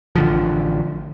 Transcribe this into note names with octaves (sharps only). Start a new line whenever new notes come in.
A1 D3 F3